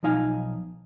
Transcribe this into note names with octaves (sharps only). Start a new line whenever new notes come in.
B1 F3 D#4 F5 G#5